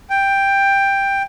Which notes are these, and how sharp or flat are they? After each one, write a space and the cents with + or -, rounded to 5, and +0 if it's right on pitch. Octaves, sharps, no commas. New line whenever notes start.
G5 +10